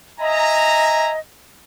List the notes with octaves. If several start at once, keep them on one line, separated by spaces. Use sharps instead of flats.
D#5 E5 G#5 A#5